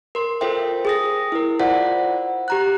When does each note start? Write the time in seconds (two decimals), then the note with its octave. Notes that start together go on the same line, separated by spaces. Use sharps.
0.15 A#4 C6
0.41 F4 A4 A#4 C5 E5 G5
0.85 G#4 D#6 A#6
1.32 E4 A#4
1.59 F4 C5 D5 E5 F#5
2.48 G4 A#5 F#6